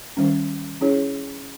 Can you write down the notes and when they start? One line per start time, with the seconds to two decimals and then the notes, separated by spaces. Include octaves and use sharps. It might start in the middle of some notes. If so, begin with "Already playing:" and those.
0.17 D#3 G3 C#4
0.81 C#4 E4 G#4 C#5